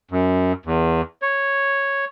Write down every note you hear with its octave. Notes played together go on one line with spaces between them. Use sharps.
F#2
E2
C#5